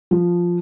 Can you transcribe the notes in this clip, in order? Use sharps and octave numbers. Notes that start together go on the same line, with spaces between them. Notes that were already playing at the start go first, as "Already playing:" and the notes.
F3